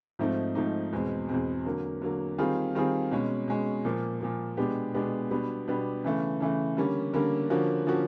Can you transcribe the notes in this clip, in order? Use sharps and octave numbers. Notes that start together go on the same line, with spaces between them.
G#2 F3 A3 C4 D#4
G#2 F3 A3 C4 D#4
E2 B2 G#3 C4
E2 B2 G#3 C4
D3 F#3 A#3
D3 F#3 A#3
D#3 G3 C4 F4 G#4
D#3 G3 C4 F4 G#4
B2 G#3 C#4
B2 G#3 C#4
A#2 F3 A#3
A#2 F3 A#3
B2 G#3 B3 D4 G4
B2 G#3 B3 D4 G4
B2 G3 B3 D4 G4
B2 G3 B3 D4 G4
C#3 E3 A3
C#3 E3 A3
D3 G3 A#3 C#4
D3 G3 A#3 C#4
D3 F3 A#3 C#4 F#4
D3 F3 A#3 C#4 F#4